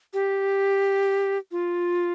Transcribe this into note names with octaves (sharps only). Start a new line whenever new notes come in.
G4
F4